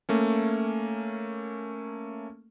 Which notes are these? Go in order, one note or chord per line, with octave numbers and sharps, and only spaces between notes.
A3 A#3 C#4